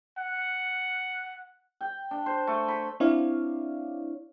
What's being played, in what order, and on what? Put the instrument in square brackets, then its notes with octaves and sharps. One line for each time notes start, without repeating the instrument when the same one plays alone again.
[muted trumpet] F#5
[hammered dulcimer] G5
D4
C5
A3
B5
[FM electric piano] C4 D4 E4 C#5 D5 F5